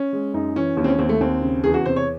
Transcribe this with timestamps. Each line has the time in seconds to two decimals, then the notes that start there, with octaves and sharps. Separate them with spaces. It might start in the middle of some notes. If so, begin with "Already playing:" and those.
Already playing: C#4
0.13 G#3
0.34 F#2 D#4
0.56 E3 C#4
0.77 D#2 C#4
0.84 C4
0.88 C#4
0.99 D#2 C4
1.09 A3
1.21 D#2 C4
1.42 C#3
1.64 E2 G#4
1.74 F#4
1.86 C3 C5
1.96 C#5